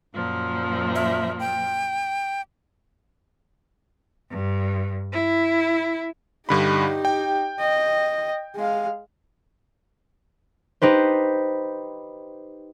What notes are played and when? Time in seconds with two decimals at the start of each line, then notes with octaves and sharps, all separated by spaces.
0.14 F#2 A#2 F3
0.95 E5
1.40 G5
4.30 G2
5.13 E4
6.49 G2 D3 D#4 G4 B5
7.05 G5
7.60 D#5
8.55 G#3 F5
10.82 D#4 G4 B4 C5